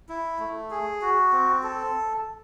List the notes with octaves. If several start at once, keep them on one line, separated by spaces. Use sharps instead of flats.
E4
A3
G#4
F#4
C4
A4